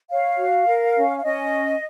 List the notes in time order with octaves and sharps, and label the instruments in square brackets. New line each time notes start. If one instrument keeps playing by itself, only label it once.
[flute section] C#5 F5
F#4
A#4
C#4
F5
C#4 D#5